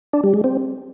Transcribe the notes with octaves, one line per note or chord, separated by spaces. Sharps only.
D4
G3
G#3
C4